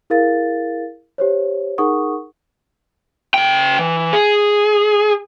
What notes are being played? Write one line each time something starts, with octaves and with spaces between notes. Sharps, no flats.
E4 G#4 A#4 F5 A6
G4 C5 C#5
D#4 G#4 A#4 F#5 C#6 D#6
C#3 G5
E3
G#4